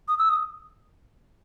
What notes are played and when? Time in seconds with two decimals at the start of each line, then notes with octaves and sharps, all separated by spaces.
0.08 D#6
0.19 E6
0.29 D#6